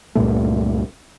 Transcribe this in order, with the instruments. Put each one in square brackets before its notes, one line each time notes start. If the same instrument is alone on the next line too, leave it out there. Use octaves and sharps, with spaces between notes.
[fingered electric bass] C#2 G2 A#2 A3